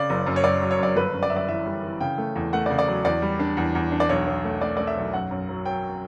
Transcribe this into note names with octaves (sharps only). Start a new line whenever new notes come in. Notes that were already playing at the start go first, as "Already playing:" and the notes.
Already playing: C#3 D5
F#1
F#2
C#5
F#2 D5
F#3
C#5
F#2 D5
G1 B4
F#2
D5
F#2 E5
D5
E3 E5
G3
E3
C#3 G5
A3
E2
A3 F#5
D5
C#3
D5
F#3
E2 D5
G3
D4
E2
E2
D4
D5
B1 C#5
B1
A3
A3 D5
A3 D5
E5
B1
F#2 F#5
F#2
F#3
F#3 G5